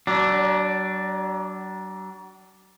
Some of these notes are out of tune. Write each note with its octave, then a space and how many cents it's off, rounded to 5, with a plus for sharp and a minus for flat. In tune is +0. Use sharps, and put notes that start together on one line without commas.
F#3 +40 D4 +0